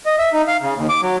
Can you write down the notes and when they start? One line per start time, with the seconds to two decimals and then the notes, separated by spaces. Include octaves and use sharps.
0.06 D#5
0.18 E5
0.33 D#4
0.48 F5
0.62 C#3
0.75 D#2
0.89 D6
1.02 F#3